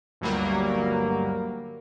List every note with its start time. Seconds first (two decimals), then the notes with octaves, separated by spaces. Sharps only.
0.21 G1 D2 F#3 G3 A#3